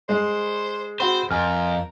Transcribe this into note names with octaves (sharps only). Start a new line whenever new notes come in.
G#3 C5
C4 F#4 C5 F#5 B5
F2 A#4 G#5 F6